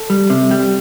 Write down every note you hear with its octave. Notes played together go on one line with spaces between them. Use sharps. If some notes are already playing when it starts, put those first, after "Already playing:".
Already playing: A4
G3
C3
G3